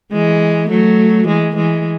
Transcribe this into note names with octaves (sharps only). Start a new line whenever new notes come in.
E3 G#3
F#3 A3
E3 G#3
E3 G#3